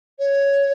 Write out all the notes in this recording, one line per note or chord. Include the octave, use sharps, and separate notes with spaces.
C#5